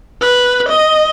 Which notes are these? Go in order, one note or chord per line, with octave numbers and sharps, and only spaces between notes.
B4
D#5